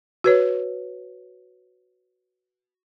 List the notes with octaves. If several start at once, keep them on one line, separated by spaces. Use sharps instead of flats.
F#4 B4 C#5